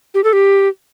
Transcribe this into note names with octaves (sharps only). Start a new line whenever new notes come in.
G4
A4
G4